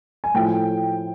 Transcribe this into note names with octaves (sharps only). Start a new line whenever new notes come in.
G#5
A2 F3 A3 G5